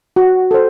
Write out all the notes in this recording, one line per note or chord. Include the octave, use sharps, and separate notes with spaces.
F#4
A4 C5